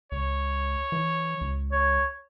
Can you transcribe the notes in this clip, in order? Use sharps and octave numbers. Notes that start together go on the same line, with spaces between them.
C#2 C#5
E3
C#2
C#5